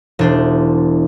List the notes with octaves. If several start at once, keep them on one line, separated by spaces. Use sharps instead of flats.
E1 D4 C5